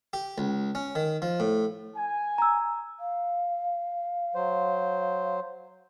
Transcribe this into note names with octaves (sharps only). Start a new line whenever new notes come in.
G4
C#2
C#4
D#3
F3
A2
G#5
A#5 E6
F5
F#3 C5